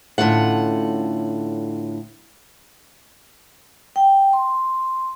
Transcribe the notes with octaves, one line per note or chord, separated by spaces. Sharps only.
A2 D3 C#4 F4 F#5
G5
C6